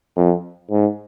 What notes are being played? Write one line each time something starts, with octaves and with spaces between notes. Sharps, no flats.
F2
G#2